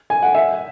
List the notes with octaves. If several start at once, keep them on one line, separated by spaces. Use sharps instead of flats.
G#5
F#5
E5